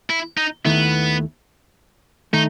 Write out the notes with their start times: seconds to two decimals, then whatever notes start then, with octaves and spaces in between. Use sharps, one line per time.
0.10 E4
0.37 D#4
0.65 D#2 D#3 A3 B3 E4
2.33 D#3 A3 D#4